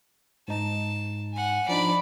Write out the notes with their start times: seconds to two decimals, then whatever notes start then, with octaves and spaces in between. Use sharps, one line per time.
0.48 G#2 D#4 A5
1.33 F#5 G#5
1.69 F3 D4 D#4 D5 B5